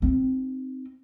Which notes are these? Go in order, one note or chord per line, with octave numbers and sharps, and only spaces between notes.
C4 D#4